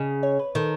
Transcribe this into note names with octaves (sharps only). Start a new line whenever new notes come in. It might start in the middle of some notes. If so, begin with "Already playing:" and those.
Already playing: C#3 D#5
C#5
B4
D#3 A4